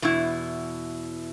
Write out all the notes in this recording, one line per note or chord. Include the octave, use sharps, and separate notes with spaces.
E2 B2 E4